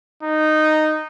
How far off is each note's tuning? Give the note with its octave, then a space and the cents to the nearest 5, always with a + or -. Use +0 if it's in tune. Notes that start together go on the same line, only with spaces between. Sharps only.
D#4 -10